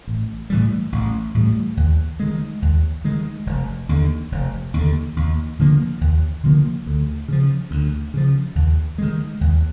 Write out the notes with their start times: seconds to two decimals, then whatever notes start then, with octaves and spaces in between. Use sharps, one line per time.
0.07 A1
0.50 A2 E3 G3
0.92 A1
1.35 A2 E3 G3
1.77 D#2
2.20 D#3 G#3
2.62 D#2
3.05 D#3 G#3
3.47 F1
3.89 D#2 D3
4.32 F1
4.74 D#2 D3
5.17 D#2
5.59 D3 F3 A#3
6.01 D#2
6.44 D3 F3 A#3
6.86 D2
7.28 C#3 F3
7.71 D2
8.14 C#3 F3
8.56 D#2
8.98 D#3 G#3
9.41 D#2